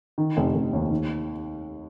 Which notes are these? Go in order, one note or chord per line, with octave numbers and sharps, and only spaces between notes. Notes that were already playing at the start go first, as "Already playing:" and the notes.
D#3
F1
F1
D#2
D#3